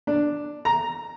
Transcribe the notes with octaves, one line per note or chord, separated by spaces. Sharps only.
D4
A#5